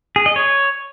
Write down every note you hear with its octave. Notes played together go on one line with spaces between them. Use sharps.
G#4
D#5
C#5